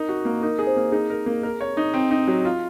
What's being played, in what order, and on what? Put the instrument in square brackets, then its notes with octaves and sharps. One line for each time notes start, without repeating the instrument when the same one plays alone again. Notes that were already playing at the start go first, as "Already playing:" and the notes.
Already playing: [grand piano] D#4 [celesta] A#4
[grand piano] F#4
A#3
[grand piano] D#4 [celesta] A#4
[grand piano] G#4
[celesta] C5
[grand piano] A#3
[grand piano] D#4 [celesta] G#4
[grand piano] A#4
A#3
A#4
C#5
D#4
C4
D#4
F#3
F4